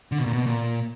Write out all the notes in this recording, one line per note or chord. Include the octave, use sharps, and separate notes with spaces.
D3
B2
A#2
B2
A#2